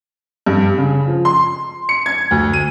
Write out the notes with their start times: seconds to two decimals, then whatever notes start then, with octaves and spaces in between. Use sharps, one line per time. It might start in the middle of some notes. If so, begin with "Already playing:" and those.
0.46 G2
0.78 C#3
1.07 F3
1.25 C6
1.89 C#7
2.06 G#6
2.31 D2
2.53 D#7